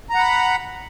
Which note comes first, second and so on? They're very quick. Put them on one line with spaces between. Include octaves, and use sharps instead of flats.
A#5 F#5 B5